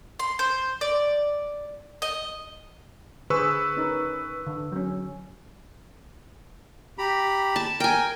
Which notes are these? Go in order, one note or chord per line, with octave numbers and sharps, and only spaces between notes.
C6
C5
D5
D#5
D3 G#4 B4 C5 C#6 E6
C#4 D#4 A#4
D3
F#3 C#4
G4 A#5 B5
A5
A#4 G5 G#5